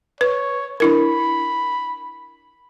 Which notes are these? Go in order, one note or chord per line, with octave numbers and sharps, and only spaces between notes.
B4 C#5
D4 E4 A#4 B5